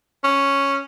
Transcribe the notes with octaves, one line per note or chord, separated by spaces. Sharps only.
C#4